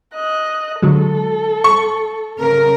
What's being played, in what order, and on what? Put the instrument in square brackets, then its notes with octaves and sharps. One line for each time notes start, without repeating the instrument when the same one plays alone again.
[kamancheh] D#5 F#6
[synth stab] D3 F#3 G#3 [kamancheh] A4
[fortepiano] C#6
[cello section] C#3 A#4